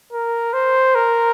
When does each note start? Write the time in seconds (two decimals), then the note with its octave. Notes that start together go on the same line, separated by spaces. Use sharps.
0.12 A#4
0.53 C5
0.95 A#4